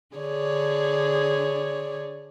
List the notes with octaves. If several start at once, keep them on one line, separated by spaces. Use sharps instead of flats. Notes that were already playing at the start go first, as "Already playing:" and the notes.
D3 G#4 C#5 D5